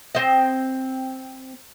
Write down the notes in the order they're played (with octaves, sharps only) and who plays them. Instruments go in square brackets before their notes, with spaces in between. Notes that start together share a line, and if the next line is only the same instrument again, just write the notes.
[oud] C4 D#5